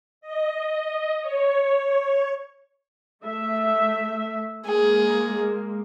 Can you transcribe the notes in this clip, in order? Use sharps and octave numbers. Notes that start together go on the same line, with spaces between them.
D#5
C#5
A3 E5
G#3 A#3 G#4